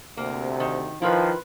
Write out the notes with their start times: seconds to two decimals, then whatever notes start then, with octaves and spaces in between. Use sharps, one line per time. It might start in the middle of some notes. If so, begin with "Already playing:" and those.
0.17 D2 C3 A#3
0.60 D#3
1.02 D#3 F3 E4 F4 B4